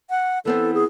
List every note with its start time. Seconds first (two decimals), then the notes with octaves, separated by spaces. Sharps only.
0.10 F#5
0.45 E3 B3 C4 A4
0.74 G#4